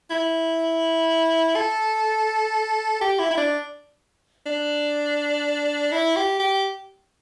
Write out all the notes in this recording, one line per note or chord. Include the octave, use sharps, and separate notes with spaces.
E4
A4
G4
E4
E4
D4
D4
E4
G4
G4